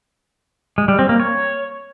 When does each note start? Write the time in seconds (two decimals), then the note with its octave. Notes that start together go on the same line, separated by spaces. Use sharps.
0.78 G#3
0.88 G3
0.99 C4
1.09 A#3
1.20 C#5